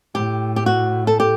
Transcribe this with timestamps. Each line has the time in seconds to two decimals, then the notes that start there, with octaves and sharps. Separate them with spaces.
0.15 A2 G4
0.56 G4
0.66 F#4
1.07 A4
1.20 G4